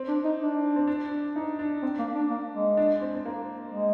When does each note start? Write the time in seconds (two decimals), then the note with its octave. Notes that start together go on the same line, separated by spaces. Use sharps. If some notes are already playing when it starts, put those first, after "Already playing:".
Already playing: C4
0.08 D4
0.24 D#4
0.40 D4
0.76 C4
0.87 D4
1.36 D#4
1.59 D4
1.83 C4
1.99 A#3
2.15 D4
2.31 A#3
2.55 G#3
2.77 D4
3.01 C4
3.15 C4
3.25 A#3
3.72 G#3